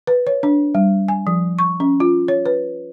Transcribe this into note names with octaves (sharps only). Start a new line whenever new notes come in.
B4
C#5
D4
G3
G#5
F3
C#6
C#4
F4
C#5
B4